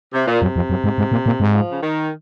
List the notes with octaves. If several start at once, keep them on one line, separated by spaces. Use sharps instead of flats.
C3
A#2
F#2 C3
F2
F#2
G#2
G#2
A#2
A#2
G#2
F3
C#3
D#3